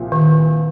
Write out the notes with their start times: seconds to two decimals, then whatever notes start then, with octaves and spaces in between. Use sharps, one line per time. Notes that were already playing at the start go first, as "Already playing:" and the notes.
Already playing: C2 A#2 F3
0.12 D#3